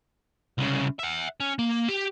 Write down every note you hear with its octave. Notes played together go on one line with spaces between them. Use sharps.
C2 C#3
E5 F#5
C#4
A#3
G4